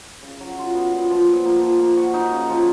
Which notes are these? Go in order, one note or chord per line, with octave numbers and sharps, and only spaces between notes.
C#3
F#3
F4
B3
A#2
F3
A#2
A#3
F3
A#3
F#4
D#4
C#3
F3